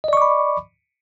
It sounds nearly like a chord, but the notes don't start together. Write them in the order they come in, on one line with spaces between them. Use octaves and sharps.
D#5 D5 C#6 D6 B5